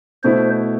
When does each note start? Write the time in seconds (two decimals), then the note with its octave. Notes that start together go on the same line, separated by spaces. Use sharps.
0.23 B2 A3 E4 C5